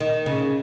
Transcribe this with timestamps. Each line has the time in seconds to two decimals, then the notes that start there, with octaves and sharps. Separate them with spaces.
0.01 D#3
0.26 C#3